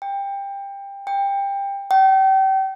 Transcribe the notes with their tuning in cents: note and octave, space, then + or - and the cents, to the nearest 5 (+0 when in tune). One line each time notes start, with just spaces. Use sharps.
G5 +20
G5 +20
G5 -35